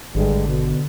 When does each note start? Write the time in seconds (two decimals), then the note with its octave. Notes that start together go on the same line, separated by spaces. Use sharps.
0.15 G#1 G2 D3 G3 G#3
0.46 B2